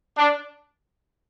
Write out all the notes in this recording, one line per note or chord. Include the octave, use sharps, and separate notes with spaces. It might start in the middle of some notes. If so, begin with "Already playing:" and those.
D4